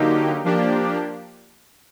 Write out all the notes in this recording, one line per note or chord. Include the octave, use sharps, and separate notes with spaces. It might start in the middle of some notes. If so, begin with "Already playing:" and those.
Already playing: D3 F#3 A#3 D#4 G4
F3 A#3 D4 G4